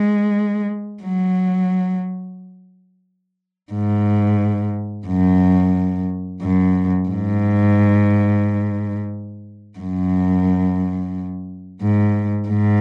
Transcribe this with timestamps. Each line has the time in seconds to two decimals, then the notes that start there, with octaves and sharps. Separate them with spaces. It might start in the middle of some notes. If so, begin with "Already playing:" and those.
Already playing: G#3
1.03 F#3
3.72 G#2
5.07 F#2
6.42 F#2
7.08 G#2
9.79 F#2
11.81 G#2
12.48 G#2